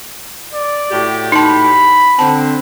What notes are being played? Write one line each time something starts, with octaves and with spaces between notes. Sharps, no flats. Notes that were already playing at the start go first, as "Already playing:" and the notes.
D5
A2 F#4 G4
D#4 A5 B5
D3 C4 A5